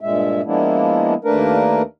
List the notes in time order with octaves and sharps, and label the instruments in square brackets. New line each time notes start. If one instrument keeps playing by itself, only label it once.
[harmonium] G2 A#2 G#3 E5
F3 G#3 A#3 B3 D4 E4
D#2 A3 A#3 D4 A#4 B4